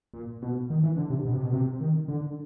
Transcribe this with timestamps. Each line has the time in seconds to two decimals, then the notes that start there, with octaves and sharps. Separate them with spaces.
0.14 A#2
0.42 B2
0.70 D#3
0.83 E3
0.97 D3
1.10 C3
1.25 B2
1.33 C3
1.43 B2
1.53 C3
1.81 D#3
2.08 D3